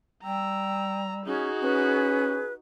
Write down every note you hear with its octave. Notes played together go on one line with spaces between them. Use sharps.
G3 G5 A#5 E6
C#4 D#4 F#4 G#4
C#4 B4